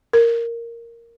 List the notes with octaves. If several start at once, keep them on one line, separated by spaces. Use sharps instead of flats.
A#4